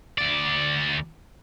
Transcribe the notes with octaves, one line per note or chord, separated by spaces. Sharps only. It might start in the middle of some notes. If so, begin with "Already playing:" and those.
D2 D5